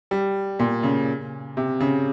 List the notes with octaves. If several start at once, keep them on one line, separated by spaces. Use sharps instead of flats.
G3
A#2
C#3
C3
C#3